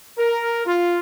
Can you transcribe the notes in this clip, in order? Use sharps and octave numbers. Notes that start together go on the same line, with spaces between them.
A#4
F4